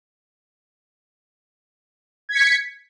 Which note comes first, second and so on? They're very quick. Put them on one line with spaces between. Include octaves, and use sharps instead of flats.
G#6 B6 C#7